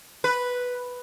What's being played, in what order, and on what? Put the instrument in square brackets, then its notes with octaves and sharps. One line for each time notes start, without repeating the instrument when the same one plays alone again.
[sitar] B4